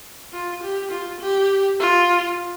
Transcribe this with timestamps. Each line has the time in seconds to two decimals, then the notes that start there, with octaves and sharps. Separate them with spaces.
0.33 F4
0.63 G4
0.91 F4
1.20 G4
1.80 F4